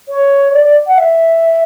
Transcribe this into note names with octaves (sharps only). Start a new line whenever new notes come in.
C#5
D5
D5
F#5
E5